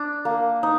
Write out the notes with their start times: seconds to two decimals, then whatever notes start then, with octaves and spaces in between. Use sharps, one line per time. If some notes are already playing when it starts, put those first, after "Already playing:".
Already playing: D4
0.25 A#3
0.63 D#4